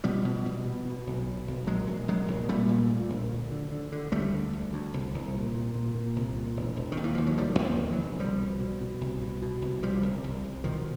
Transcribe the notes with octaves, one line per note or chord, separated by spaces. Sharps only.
B2 F3 G3
B2
B2
B2
B2
B1
B2
B1
A#1 F#3 G#3
A#1
A#1 F#3 G#3
A#1
A#2 G3 A3
A#2
A#2
A#1
D2
D3
D3
D3
D2 G3 A3
D3
D2
D2
C2
C2
A#2
A#2
A#2
A#2
C2
A#2
E1
E1
D#3
D#2
E3
D#2 F3
F#3
E1 F3 G3
D#2
D#3 F3
D3
E3 F#3
E1
C2 F3 G3
B2
B2
B2
C2
B2
B2
C2
C2 F3 G3
C2
C2
C2
B2 D#3 F3